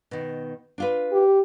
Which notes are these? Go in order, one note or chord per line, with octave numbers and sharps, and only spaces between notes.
B2 D#3
D4 F4 B4
G4